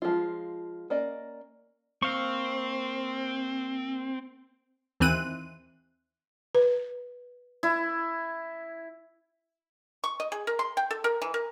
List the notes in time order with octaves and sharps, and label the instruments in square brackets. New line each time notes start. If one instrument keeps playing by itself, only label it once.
[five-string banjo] F3 G#3 F4
A#3 C#4 D5 D#5
[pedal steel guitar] A#3 F5 C#6 [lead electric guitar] C4
[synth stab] D#2 E3 C4 F#6 D#7
[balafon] B4
[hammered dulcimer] E4
[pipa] C#6
D#5
G#4
A#4
C6
G5
A4
A#4
E3
A#4